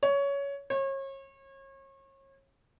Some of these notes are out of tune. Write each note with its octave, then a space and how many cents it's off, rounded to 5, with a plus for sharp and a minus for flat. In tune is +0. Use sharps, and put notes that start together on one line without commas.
C#5 +15
C#5 -35